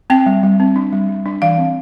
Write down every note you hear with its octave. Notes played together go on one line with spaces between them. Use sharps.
C4 G5
G3
G3
C4
D4
G3
G3
D4
E3 F5
C4